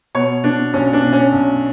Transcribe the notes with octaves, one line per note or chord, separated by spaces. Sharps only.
B2 C#5
B2 D4
B1 C#4
D4
B2
C#4
B1